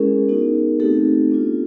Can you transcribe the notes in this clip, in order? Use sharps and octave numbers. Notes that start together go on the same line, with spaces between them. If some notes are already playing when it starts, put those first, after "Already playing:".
Already playing: G#3 C#4 E4 G#4 A#4
B3 D#4 F#4
A3 C4 D#4 F#4 G4 A4
B3 D4 F4